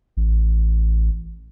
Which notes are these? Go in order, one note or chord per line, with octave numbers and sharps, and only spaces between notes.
A1